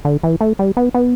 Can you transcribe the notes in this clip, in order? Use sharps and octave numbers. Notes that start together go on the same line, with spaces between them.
D3
E3
A3
G3
B3
B3